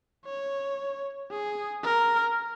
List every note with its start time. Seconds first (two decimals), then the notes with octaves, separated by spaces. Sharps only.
0.25 C#5
1.31 G#4
1.83 A#4